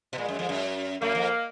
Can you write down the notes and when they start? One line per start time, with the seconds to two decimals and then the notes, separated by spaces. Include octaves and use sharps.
0.13 B2
0.18 A#2 G#3
0.29 F#2
0.39 F2
0.49 F#2
1.02 F#2 A#3
1.15 F2